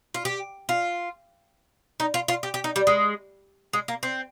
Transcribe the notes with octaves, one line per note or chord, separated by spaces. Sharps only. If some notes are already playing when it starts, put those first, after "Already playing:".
F4
G4
F4
D#4
F4
F4
G4
G4
D#4
G3
G#3
G#3
A#3
C4